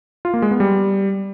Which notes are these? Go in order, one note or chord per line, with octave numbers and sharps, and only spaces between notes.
F4
A#3
G#3
B3
G3